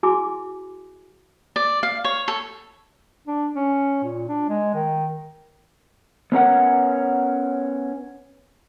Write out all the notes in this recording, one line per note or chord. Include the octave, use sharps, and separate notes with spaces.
E4 F#4 G#4 G#5 D6 E6
D5
F5
C#5
A4
D4
C#4
A#2
D4
G#3
D#3
B3 C#4 A#4 F#5